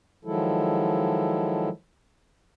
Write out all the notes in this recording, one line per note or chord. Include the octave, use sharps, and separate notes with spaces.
D#3 F3 F#3 G#3 E4 A4